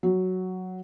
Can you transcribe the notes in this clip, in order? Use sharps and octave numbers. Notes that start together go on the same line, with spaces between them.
F#3